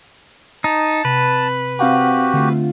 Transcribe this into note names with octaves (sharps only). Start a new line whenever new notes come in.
D#4 A5
C3 B4
C4 F#4 G4 F5 F#5
D3 A3 F4